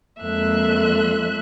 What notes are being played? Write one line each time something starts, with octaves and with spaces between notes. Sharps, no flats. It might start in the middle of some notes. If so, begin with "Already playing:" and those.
F2 G#3 A#3 A4 E5 F#6